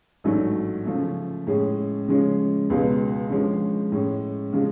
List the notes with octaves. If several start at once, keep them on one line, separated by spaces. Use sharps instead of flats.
A1 G#2 F#3 A3 D4
C#3 F3 A3
A2 G#3 C#4 G#4
C#3 F3 G#3 C#4
C#2 B2 G#3 B3
D3 F3 G#3 C#4
A2 G#3 C#4
C#3 F3 G#3